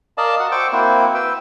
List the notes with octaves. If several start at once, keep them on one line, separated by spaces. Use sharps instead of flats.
A#4 D5 D#5 F5 A5
F#4 F#5
C5 G5 C#6 D6 E6
A#3 C4 E4 F#4 C5
B4 G5 E6